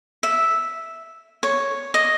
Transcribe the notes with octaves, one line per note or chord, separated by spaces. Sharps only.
E5
C#5
D#5